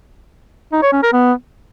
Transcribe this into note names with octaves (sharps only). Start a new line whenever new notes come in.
D#4
C#5
C#4
A#4
B3